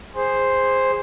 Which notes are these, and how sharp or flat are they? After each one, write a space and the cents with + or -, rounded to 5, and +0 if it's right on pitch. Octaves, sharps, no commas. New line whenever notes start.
G#4 -20 C5 +0